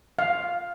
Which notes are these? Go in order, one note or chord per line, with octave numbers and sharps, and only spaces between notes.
F5